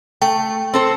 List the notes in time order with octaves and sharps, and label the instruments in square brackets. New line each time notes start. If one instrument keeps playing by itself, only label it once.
[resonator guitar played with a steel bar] A3 [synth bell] G5
[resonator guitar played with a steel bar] C4 A4 C5